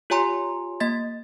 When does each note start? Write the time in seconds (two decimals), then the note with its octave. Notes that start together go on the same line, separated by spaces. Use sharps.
0.10 F4 G4 C#5 G#5 A#5 C6
0.80 A#3 D#5 A6